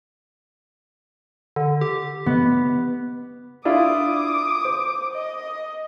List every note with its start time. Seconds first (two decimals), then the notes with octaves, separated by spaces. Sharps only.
1.56 D3
1.81 G4
2.26 B3
3.65 D4 E4 F4 D6 D#6
4.65 C5
5.13 D#5